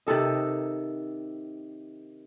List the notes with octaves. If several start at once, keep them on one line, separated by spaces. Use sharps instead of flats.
C3 D#3 A4 D#5